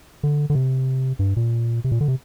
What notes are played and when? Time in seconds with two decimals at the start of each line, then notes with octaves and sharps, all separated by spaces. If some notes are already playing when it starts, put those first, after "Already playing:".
0.23 D3
0.50 D3
0.55 C3
1.19 G2
1.37 A#2
1.84 C3
1.92 A#2
2.01 D3
2.08 C3